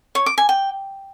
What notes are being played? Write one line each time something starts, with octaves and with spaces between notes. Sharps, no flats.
C#5
D6
G#5
G5